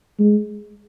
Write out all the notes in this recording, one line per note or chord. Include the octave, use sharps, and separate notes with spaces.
G#3